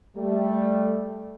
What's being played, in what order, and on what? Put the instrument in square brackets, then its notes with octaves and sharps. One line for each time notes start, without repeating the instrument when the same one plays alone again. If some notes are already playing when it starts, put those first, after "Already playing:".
[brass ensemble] G3 A3